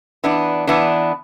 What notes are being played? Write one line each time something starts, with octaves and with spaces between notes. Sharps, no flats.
E3 B3 D4
E3 B3 D4